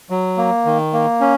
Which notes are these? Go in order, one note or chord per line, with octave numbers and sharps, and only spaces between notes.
F#3
A#3
D#3
A#3
C#4